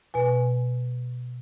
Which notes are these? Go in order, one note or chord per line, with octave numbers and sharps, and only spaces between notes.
B2 B4 G#5